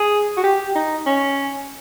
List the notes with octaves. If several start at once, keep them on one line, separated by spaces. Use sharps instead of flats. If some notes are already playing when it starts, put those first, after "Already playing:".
Already playing: G#4
F#4
G4
D#4
C#4